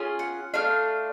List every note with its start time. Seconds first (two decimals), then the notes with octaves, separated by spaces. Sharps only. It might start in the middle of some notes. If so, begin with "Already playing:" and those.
Already playing: C#4 F4 G#4
0.19 F#5
0.54 A3 D4 F4 F5